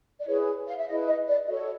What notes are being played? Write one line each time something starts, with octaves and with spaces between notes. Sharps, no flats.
D5
E4 G#4 B4 C#5
F5
E5
E4 G#4 B4 D#5
D#5
D5
F#4 A4 C#5 D#5